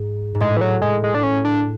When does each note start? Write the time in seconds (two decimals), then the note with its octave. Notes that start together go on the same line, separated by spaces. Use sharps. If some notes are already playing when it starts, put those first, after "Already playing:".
Already playing: G#2
0.35 G#2
0.40 A2 G#3
0.57 E3
0.61 F#3
0.82 A2 G#3
1.04 G#3
1.15 D4
1.23 C#4
1.45 D4